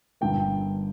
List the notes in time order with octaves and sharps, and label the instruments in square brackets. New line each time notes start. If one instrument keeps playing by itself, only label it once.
[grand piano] G1 G2 D3 A#3 G5